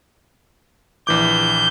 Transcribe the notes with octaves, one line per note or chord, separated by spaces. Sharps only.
A#1 E3 D6 G6